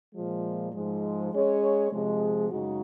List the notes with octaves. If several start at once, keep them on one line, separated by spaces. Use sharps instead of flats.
A#2 F3 G#3
G#2 F3 G#3
G#3 C#4 G#4 C#5
C3 F3 G#3
F#2 C#3 G#3 D#4 F#4